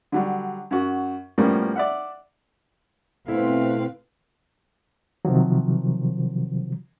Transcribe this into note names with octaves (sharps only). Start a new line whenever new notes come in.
D3 F#3 G3
F#2 F#4
A2 F3 G3 A#3 B3 C#4
D5 E5 F#5
B2 A3 C4 E4 B4 F5
C3 D#3 F3 F#3